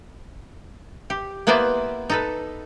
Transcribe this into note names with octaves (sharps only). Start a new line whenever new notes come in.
G4
A#3 B3 E4 B4 C5 D5
D#4 A4 B4